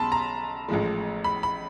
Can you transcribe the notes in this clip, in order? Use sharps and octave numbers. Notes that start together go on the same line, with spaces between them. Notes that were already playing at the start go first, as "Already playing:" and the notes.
Already playing: B1 B2 G#3 C#4 A5 B5 C6
A#5
A1 A2 F3 G#3
B5
B5